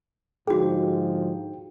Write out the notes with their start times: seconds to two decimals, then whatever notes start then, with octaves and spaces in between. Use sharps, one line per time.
0.47 G#2 D3 F3 D#4 F#4 G#4 G5